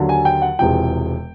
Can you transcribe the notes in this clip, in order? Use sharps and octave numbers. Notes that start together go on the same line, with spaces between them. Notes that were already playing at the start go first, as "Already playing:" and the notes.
Already playing: D#2 D3 F#3
G#5
G5
F#5
E1 E2 C3 F3 G5